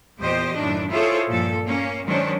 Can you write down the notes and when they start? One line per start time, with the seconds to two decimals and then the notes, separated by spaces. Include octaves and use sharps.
0.19 E2 A#2 G4 C5 D#5
0.56 F#2 A2 D#3 D4
0.90 E4 F4 G#4 A4 C5 C#5
1.29 G2 A#2 F3 A4
1.64 A#3 C#4
2.05 D#3 F#3 G#3 C#4 D4 C5